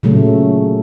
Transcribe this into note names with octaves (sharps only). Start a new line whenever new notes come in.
A#2 C#3 F#3 A3